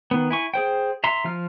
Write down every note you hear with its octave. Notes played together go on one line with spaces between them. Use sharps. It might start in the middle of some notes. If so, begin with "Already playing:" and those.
D#3 B3
E4 G#5 C#6
G#4 C5 G5
E5 A#5 C6
F3 F4 F6